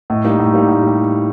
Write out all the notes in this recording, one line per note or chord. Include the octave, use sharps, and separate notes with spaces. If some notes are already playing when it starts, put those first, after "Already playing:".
A2 D#5
G3 A#3 D#4
A2
G3 A#3 D#4
A2
G3